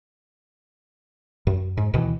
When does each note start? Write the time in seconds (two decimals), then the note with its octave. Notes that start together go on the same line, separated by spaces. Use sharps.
1.47 F#2
1.77 G#2
1.94 D2 B2 D#3 E3